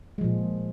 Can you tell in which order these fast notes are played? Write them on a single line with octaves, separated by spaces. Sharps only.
G#3 F3 A#2